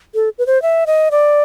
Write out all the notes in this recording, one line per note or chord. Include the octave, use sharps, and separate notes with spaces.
A4
B4
C5
E5
D#5
D5